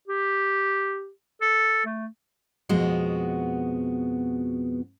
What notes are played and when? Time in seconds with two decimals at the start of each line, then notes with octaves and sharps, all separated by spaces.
0.07 G4
1.41 A4
1.85 A3
2.69 F2 B2 G#3 B3 F#4